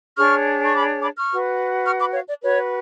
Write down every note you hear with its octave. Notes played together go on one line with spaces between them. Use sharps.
D4 G#4 C#5 C#6 F6
C#6
B5 D6
B5 D6
C#6 F6
F#4 B4
C#6 F6
B5 D6
C#5 F5
D5
F#4 B4 C#5